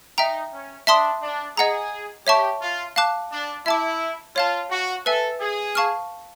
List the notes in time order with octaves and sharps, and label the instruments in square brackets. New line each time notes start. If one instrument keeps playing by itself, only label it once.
[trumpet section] D#4 [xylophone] E5 G5 A#5
[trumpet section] C#4
[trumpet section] D4 [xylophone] E5 A5 C6 D#6
[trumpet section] D4
[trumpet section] G#4 [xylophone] D#5 F#5 A#5
[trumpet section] G4 [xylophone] C#5 E5 A5 C#6
[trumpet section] F4
[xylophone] F5 A5 D6 F#6
[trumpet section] D4
[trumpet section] E4 [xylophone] E5 A5 D6
[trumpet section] F4 [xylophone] C#5 F5 A5
[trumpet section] F#4
[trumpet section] A4 [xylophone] B4 E5 G#5
[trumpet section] G#4
[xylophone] F5 A5 C#6 F6